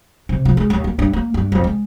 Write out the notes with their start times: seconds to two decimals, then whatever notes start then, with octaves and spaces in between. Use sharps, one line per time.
0.29 C3
0.45 F3
0.57 G#3
0.70 D#2
0.84 A#3
0.99 G2
1.13 A#3
1.34 G2
1.52 F2
1.64 G#3